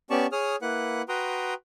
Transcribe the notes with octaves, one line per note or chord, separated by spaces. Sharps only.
B3 C#4 G4 D5 A5 C#6
G#4 C#5 D#6 F6
A#3 E4 B4 F#5 F#6
F#4 B4 G5 A#5 C6 D#6